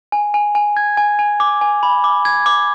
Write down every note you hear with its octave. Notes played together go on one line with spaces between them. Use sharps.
G#5
G#5
G#5
G#6
G#5
G#5
D6
G#5
B5
D6
G#6
D6